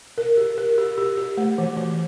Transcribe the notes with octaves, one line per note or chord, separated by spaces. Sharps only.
A#4
G4
A#4
G4
G4
G4
A3
E3
E3